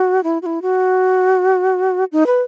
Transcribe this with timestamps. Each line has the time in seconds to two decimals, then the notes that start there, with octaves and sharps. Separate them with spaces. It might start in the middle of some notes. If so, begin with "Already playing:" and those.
Already playing: F#4
0.24 E4
0.42 F#4
0.46 E4
0.62 F#4
2.12 D#4
2.27 B4